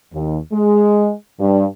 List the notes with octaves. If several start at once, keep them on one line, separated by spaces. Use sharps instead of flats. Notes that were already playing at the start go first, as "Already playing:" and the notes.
D#2
G#3
G2